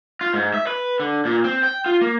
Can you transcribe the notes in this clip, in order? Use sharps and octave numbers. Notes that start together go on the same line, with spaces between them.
F4
G#2
E5
B4
D3
A#2
C4
G5
F4
A#3